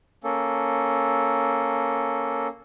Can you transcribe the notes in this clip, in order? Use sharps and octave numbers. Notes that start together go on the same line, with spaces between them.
A#3 C#4 A4